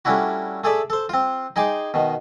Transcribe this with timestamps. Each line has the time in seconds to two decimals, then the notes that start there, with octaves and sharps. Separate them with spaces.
0.05 G3 A3 C#4 D4 E4 F#4
0.64 A3 G#4 A4 D5 E5
0.90 A4 C5
1.09 C4 F4
1.56 D#4 G#4 G5 G#5 C6 D6
1.94 B2 D#3